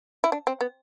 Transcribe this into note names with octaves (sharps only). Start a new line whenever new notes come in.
E4
D4
C4
B3